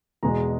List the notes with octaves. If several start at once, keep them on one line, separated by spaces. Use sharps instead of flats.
E2 B2 G#3 A#5